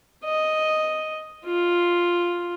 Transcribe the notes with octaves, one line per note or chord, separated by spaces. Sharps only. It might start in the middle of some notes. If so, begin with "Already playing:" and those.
D#5
F4